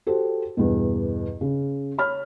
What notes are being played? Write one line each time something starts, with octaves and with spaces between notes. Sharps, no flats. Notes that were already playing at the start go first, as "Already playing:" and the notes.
F#4 G4 A4 C5
E2 G2 B2
C#3
C#5 B5 F6